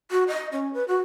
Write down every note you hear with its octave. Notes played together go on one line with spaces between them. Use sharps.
F#4
D#5
C#4
B4
F#4